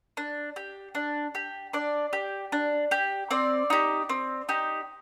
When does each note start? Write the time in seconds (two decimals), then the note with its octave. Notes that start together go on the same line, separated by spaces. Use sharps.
0.17 D4
0.56 G4
0.95 D4
1.35 G4
1.73 D4 D5
2.13 G4
2.52 D4
2.91 G4
3.30 C4 D5
3.70 D#4 G4
4.09 C4
4.49 D#4 G4